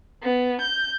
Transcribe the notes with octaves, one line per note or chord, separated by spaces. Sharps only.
B3
G6